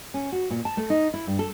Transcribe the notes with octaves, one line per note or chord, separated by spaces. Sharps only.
C#4
F#4
A#2
A5
A3
D#4
E4
G2
A4